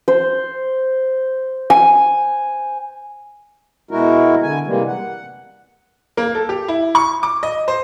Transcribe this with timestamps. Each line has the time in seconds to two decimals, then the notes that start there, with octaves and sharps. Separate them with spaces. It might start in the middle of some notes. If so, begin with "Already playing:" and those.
0.08 C5
1.70 G#5
3.91 B2 G#3 E4 F#4 A#4
4.43 D3 G#5
4.67 C3 E3 G3 G#3 A#3
4.87 F#5
6.17 A#3
6.35 A4
6.49 G4
6.68 E4
6.95 C#6
7.23 D6
7.43 D#5
7.68 C5